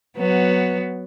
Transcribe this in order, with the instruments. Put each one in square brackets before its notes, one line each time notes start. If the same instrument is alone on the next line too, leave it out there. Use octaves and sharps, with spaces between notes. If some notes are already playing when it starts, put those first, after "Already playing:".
[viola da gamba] F#3 B3